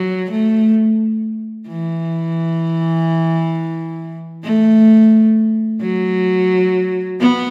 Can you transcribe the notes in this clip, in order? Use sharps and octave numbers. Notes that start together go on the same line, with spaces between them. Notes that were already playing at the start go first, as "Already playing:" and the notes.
Already playing: F#3
A3
E3
A3
F#3
B3